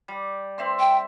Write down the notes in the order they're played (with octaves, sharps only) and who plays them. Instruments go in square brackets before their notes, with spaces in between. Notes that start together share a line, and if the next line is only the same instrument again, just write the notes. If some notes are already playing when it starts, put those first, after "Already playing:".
[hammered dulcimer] G3
C4 E5 C6
[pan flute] G5